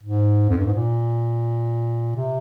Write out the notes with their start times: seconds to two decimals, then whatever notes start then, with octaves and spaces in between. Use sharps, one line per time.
0.03 G#2
0.50 F2
0.58 G2
0.66 G#2
0.74 A#2
2.16 C3